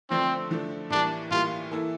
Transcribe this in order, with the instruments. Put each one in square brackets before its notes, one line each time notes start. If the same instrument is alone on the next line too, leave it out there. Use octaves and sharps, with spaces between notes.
[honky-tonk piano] D3 F3 A3 D4 A4 [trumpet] C4
[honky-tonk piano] D3 F3 A3 D4 A4
[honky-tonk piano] A2 E3 G3 A#3 [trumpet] D4
[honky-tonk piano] A2 E3 G3 A#3 [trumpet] F4
[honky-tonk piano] E3 A#3 E4 A4